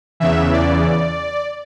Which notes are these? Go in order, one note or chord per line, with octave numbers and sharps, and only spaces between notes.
E2 C#3 E3 E5
D5